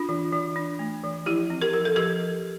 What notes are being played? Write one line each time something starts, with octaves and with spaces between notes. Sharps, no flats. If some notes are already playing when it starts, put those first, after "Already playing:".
Already playing: D4 F4
E3
E3
D4
A3
E3
F3 E4 G4
C4
G4 A#4
F3 A#4
A4
F3 G4 A#4